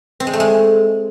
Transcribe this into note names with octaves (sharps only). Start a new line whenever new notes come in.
C4
G#3
A3
G#3